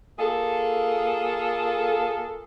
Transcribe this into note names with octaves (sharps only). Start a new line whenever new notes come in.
A#3 F4 G#4 A4